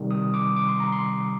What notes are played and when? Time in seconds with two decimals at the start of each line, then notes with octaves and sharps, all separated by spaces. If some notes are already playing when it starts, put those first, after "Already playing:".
Already playing: C3 D#3 G3
0.11 D#6
0.34 D6
0.56 D6
0.68 C6
0.80 A#5
0.92 C6